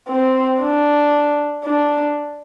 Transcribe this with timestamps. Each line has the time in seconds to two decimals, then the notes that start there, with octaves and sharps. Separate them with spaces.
0.08 C4
0.60 D4
1.64 D4